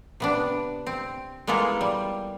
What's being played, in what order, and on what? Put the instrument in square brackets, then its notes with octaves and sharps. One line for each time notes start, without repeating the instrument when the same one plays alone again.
[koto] C3 B3 D4
C4
G#3 A#3 B3 E4 F4 A4
G3